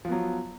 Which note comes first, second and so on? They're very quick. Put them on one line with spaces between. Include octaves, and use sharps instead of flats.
F3 B3 F#3